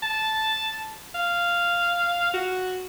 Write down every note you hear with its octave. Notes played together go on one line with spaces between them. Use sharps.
A5
F5
F#4